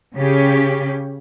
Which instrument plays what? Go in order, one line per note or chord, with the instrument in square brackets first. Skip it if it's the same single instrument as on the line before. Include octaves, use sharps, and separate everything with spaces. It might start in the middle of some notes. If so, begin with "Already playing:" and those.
[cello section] C#3 C#4 G4